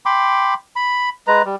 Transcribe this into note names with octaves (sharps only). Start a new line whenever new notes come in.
G5 B5 C6 D6
B5
G#3 B4 A#5
G3